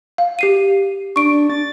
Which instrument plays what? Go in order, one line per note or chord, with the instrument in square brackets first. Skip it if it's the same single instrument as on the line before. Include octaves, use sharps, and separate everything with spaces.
[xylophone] F5
G4 C7 D#7
[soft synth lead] D4 [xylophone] C#6 D7
[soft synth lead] A6